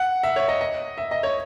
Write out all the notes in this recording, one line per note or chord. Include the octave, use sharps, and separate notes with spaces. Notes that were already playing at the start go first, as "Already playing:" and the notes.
Already playing: F#5
E5
C#5
D#5
D#5
E5
D#5
C#5